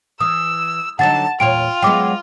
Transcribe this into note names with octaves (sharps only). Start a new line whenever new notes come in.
E3 D#6 E6
D3 F#3 D#4 F#5 A5 A6
E2 A#2 F4 C#5 G5 D7
F#3 G#3 B3 G5 D6